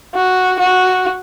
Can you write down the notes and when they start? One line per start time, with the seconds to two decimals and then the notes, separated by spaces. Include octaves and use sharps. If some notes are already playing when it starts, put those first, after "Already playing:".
0.15 F#4
0.59 F#4